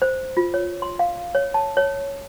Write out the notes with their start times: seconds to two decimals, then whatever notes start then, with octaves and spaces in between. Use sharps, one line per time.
0.02 C5
0.37 F4
0.54 C#5
0.82 C6
0.99 F5
1.35 C#5
1.54 A5
1.77 C#5